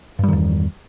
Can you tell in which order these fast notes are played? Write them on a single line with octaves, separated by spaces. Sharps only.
G2 G3 D#3 E2